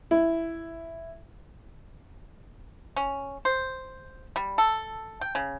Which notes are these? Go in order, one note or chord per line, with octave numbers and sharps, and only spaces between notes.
E4
C#4
C5
G3
A4
G5
C#3